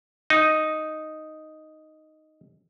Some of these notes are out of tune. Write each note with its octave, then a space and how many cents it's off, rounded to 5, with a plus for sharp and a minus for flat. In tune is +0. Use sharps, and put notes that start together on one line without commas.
D#4 +0